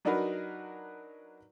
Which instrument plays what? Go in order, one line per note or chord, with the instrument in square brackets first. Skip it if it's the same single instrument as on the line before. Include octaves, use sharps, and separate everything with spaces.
[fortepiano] F#3 D4 D#4 F#4 A#4 B4